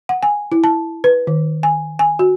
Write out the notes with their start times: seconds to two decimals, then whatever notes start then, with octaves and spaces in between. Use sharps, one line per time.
0.09 F#5
0.23 G#5
0.52 E4
0.64 A5
1.04 B4
1.27 D#3
1.63 G#5
1.99 G#5
2.19 F#4